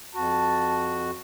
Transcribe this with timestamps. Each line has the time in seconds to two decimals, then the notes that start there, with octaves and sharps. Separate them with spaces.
0.15 F2 F#4 A5